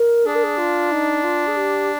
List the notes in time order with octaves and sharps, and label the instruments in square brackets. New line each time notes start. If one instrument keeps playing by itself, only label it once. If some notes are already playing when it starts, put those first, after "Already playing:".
Already playing: [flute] A#4
[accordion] D4 [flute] G#4
[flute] A#4
G#4
F4
D#4
F4
G#4
G4